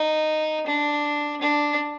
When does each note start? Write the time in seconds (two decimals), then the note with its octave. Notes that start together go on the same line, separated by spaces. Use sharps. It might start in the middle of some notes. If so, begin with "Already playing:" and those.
Already playing: D#4
0.66 D4
1.41 D4